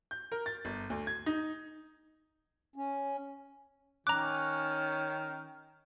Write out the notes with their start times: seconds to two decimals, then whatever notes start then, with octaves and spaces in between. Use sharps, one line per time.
0.11 G6
0.32 A#4
0.46 A6
0.65 G1
0.90 D2
1.07 G#6
1.26 D#4
2.76 C#4
4.07 D#3 C#4 A#5 D6 F#6